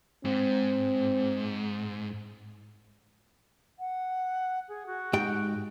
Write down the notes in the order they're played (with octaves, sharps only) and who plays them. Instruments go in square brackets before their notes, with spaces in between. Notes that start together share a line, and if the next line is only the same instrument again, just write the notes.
[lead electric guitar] G#2 [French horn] C4
[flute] F#5
G#4
F#4
[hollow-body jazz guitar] G#2 G4 G5